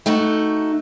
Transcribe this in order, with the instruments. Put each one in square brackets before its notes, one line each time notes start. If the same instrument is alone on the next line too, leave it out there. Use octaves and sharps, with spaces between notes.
[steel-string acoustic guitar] A3 D#4 F#4